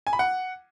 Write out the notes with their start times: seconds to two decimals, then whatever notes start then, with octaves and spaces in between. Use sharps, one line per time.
0.07 G#5
0.13 B5
0.19 F#5